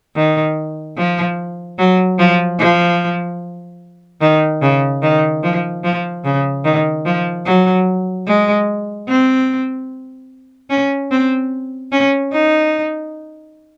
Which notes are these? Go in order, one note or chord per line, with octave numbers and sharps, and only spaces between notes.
D#3
F3
F#3
F3
F3
D#3
C#3
D#3
F3
F3
C#3
D#3
F3
F#3
G#3
C4
C#4
C4
C#4
D#4